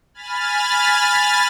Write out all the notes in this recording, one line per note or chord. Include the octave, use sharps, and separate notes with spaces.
G#5 B5 F6 A6